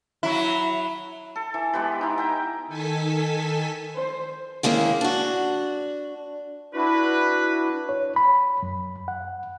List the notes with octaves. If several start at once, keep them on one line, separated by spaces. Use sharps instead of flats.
F#3 E4
A4
E3
G#3 B3 G4 B4
D#4 E4
E5 G5 A#5
D#3 A4 G#5 A5 B6
C5
D#3 G#3 A#3 C#4 E4
D4 F#4
D4 E4 F#4 B4
C#5
B5
F#2
F#5